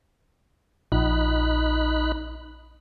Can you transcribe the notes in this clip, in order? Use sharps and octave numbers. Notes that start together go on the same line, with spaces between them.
A#1 D#4 B5 F#6